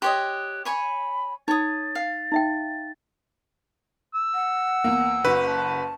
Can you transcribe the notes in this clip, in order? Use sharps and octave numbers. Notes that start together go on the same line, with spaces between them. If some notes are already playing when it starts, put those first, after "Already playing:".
G4 C#5 D#5 C6 F#6
C#5 G#5 B5 C#6
D#4 C#5 D#6 A6
F5
D#4 E5 G5
E6
F#5
E2 A#3
F#1 F#4 B4
A5